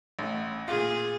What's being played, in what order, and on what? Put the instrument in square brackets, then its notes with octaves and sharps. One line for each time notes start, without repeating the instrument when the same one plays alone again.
[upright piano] A1 A2
[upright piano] A#2 F4 [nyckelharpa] G#4